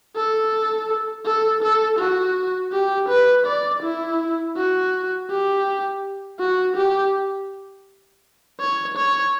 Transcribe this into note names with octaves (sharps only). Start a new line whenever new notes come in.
A4
A4
A4
F#4
G4
B4
D5
E4
F#4
G4
F#4
G4
C#5
C#5